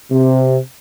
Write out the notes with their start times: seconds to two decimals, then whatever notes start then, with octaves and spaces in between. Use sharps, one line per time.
0.11 C3